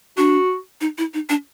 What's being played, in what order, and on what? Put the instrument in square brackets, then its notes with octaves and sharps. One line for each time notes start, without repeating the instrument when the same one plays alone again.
[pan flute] D4 [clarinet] F#4
[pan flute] D#4
E4
D#4
D4